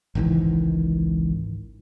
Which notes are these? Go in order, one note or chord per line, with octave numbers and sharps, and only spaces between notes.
G#1 C#2 D#3 E3